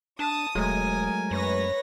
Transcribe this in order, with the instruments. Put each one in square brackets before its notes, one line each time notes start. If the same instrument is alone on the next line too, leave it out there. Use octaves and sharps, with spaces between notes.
[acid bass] D4 [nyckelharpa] A5 [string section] D#6
[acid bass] E1 [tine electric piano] F#3 G#3 A3 [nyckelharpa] A#4 G#5
[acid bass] F#2 [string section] B4 C#5 A#6